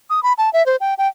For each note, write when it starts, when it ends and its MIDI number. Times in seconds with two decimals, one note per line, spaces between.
0.10 0.23 87
0.23 0.33 83
0.38 0.52 81
0.53 0.65 76
0.66 0.76 72
0.80 0.94 79
0.98 1.08 79